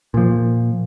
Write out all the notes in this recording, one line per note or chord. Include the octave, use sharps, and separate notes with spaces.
A#2 F3